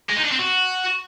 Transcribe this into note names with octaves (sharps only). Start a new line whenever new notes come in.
G#3
D#4
D4
C4
F#4